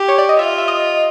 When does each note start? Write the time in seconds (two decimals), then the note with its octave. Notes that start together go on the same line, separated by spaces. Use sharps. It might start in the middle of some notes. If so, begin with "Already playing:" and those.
Already playing: G4
0.08 C#5
0.18 D5
0.29 D#5
0.39 F4 E5
0.58 E5
0.68 D#5